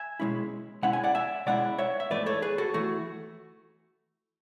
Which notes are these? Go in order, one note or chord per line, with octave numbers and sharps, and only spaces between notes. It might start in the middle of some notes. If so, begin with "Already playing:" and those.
Already playing: E5 G#5
B2 G#3 C#4 E4
B2 G#3 C#4 E4 F#5
G#5
D5 F#5
E5 G#5
B2 G#3 C#4 E4 D5 F#5
C#5 E5
E5
G#2 E3 A3 B4 D5
A4 C#5
G#4 B4
F#4 A4
E3 A3 F#4